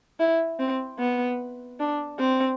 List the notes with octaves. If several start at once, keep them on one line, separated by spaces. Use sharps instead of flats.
E4
C4
B3
D4
C4